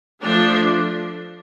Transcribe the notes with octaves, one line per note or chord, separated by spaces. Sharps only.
F3 A3 D4